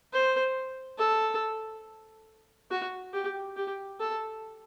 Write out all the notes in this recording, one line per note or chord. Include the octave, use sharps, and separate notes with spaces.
C5
A4
F#4
G4
G4
A4